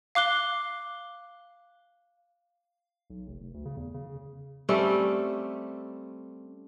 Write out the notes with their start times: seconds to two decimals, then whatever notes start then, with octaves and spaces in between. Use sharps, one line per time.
0.15 F5 D6 F#6 G7
3.10 B1
3.27 F1
3.40 F1
3.54 D2
3.65 C#3
3.77 E2
3.94 C#3
4.06 C#3
4.69 G3 A3 C4 C#4